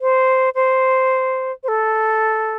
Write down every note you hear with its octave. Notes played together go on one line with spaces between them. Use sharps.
C5
C5
C5
A4